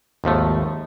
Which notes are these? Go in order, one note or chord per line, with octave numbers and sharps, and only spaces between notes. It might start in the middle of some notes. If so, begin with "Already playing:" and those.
G#1 D#2 F3 A3